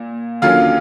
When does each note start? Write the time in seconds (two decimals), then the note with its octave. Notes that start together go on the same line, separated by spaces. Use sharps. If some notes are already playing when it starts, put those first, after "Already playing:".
Already playing: A#2
0.42 D#2 D3 F#3 A#3 C#4 F4 F5